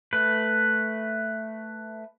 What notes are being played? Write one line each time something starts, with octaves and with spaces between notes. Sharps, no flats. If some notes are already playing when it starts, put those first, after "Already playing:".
A3 B4